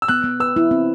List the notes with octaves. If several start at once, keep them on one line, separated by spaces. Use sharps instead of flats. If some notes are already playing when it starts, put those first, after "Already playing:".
E6
B3 F#6
B3
B4 E6
E4
C4